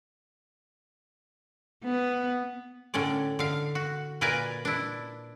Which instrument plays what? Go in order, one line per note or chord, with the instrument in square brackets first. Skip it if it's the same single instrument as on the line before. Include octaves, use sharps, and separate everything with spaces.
[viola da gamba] B3
[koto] A2 D3 C#4 D5
D3 F5
F#4
A#2 A#4 B4 D5 G#5 A#5
D4 E4